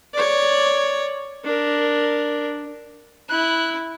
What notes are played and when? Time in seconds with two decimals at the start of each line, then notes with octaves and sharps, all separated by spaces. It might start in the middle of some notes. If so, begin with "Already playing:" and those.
0.13 C#5 D5
1.45 D4 A#4
3.30 E4 F#6